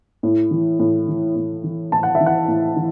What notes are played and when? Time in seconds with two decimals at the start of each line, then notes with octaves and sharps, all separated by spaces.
0.23 A2
0.51 E3
0.79 A2
1.08 E3
1.36 A2
1.64 E3
1.92 A2 A5
2.03 F#5
2.15 E5
2.20 E3
2.26 F#5
2.48 A2
2.76 E3